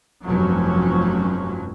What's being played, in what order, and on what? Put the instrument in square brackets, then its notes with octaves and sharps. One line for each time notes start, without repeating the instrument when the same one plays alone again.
[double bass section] F1 G2 F3 F#3 C#4